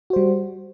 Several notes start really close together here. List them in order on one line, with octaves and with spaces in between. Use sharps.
F#4 C5 G3